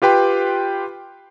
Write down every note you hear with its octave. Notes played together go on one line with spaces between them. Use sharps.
F4 G4 B4 G5 C6